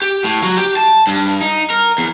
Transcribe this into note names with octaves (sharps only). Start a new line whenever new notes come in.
G4
A2
F#3
G4
A5
G2
D#4
A#4
E2